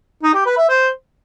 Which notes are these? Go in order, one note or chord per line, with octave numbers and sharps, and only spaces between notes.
D#4
G4
B4
E5
C5